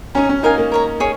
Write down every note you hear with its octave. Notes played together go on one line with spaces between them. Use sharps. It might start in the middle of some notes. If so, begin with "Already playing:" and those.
C#4 D#4 C#5 A#5
C#4
D#4 A#4 F5 G#5
A#3
A#4 C#5 A#5
G#4 C#5